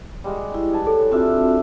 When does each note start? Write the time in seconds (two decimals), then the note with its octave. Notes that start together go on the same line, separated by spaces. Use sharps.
0.24 G3 G#3 F#4
0.54 E4
0.73 B4 G#5 A5
0.87 A4 C#5
1.12 C4 D4 F4 F#4 E5